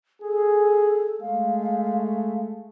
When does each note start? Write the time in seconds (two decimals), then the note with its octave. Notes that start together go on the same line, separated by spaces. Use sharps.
0.22 G#4 A4
1.21 G#3 A3 F5